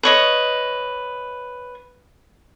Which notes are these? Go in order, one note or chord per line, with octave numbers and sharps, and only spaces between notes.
B4 C#5 D#5